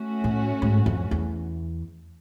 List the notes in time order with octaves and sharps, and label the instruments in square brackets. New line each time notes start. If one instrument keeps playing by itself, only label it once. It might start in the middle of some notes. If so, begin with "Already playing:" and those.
Already playing: [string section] A3 C#4 F#4
[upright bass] A2
G#2
F2
E2